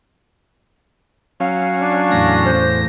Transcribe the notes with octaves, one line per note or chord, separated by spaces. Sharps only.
F#3 C#4 F5
D4
E2 A2 A#6
C5